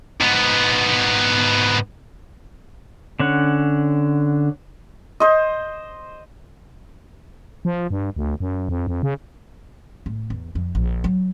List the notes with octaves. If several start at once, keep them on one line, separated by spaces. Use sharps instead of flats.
G#2 B3
D3 C#4 F#5
C5 D#5
F3
G2
D2
F#2
F2
F2
C#3
A2
E2
F2
A#1
F#3